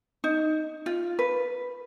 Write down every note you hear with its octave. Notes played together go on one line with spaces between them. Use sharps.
D#4
F4
B4